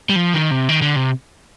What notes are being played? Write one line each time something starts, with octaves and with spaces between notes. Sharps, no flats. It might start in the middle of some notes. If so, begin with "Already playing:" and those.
G3
F3
D#3
C3
D#3
D3
C3